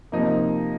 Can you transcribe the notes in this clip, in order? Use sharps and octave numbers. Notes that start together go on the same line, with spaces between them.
C3 F3 A#3 D#4